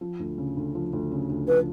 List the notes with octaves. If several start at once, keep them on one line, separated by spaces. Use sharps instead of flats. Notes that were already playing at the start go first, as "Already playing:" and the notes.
F3
D2
C#3
D2
F3
D2
C#3
D2
F3 B4